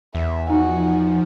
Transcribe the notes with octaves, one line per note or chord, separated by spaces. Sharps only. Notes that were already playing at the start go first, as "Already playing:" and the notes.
E2 E5
F3 D#4 F#4 G#5